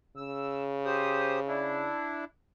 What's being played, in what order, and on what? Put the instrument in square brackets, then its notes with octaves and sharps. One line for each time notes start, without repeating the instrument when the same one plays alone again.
[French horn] C#3 [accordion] E6
[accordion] G4 C5 D#6
D4 E4